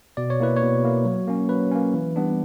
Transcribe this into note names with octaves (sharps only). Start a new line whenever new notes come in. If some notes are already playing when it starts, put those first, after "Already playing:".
B2 D5
C#5
A#3 E4 B4
C#5
B2
A#3 E4
F#3
A#3 C#4
F#3 B4
A#3 C#4
E3
G3 B3 D4